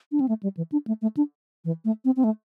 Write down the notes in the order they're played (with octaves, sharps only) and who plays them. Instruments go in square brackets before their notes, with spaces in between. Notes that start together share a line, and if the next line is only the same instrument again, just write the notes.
[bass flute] D4
C4
A3
G3
E3
D4
A3
A3
D4
E3
A3
C4
C4
A3